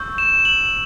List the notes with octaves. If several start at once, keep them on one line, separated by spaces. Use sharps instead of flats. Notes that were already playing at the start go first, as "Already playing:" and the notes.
Already playing: C#6 E6 G6
E7
F#7